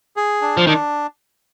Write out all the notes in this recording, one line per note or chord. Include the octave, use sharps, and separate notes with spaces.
G#4
D4
F3
D#3 D4